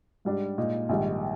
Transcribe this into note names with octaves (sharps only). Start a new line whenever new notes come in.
G#2 G3 D4
A#2 G#3 D#4
A#1 G#2 D#3 G3